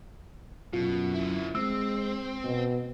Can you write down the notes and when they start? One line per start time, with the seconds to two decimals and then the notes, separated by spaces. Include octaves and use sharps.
0.73 F#2 B2 F4
1.14 D3 E4
1.55 G#3 C4 E6
2.44 B2